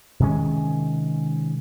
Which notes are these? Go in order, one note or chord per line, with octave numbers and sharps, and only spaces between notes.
C3 D#3 G#3 C#4